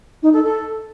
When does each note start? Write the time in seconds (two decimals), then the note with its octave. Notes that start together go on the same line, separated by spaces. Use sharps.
0.22 D#4
0.33 A4
0.43 A4